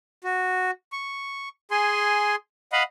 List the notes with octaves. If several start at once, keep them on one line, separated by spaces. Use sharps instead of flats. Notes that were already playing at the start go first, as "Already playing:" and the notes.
F#4
C#6
G#4 G#5 C6
D#5 F5 F#5 B5